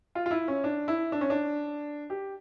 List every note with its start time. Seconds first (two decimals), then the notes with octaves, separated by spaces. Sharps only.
0.15 F4
0.26 F4
0.31 E4
0.48 C#4
0.64 D4
0.88 E4
1.12 D4
1.21 C#4
1.30 D4
2.10 G4